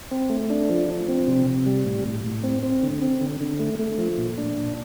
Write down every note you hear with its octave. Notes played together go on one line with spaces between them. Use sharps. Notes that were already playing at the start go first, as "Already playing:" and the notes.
C4
A3
D4
F3
F3
C4
C3
C3
G3
A2
A2
A2
C4
C4
D3
C4
D3
D3
A3
A3
F3
A#2
D4
A#2